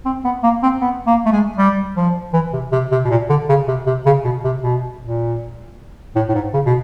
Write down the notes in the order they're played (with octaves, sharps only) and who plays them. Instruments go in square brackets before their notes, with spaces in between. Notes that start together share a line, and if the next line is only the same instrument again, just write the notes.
[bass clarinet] C4
B3
A#3
C4
B3
A#3
A3
G#3
G3
F3
E3
C3
C3
C3
B2
A#2
D3
C#3
C3
C3
C#3
B2
C3
B2
A#2
A2
A2
G#2
C#3
B2